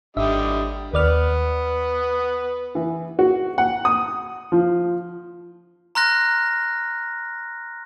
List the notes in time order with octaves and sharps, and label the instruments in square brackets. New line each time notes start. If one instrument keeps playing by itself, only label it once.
[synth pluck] G#1 E5 [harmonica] D3 G3 D#5
[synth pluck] D#2 D5 F6 [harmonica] B3 B4
[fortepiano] E3
F#4
F#5
D#6
F3
[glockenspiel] A#5 C6 F6 F#6 A#6